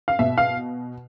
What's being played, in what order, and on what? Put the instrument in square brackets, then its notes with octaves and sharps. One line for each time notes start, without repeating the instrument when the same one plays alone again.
[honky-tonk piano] F5
B2 E5
F5